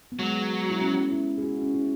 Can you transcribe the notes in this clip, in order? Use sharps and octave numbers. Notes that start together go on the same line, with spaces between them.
B3
F#3 G#3
E4
C#4
E4
G#4
F#4
C#4
E4